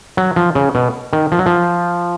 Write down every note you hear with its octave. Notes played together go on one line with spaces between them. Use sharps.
F#3
F3
C#3
B2
D#3
F3
F#3
F3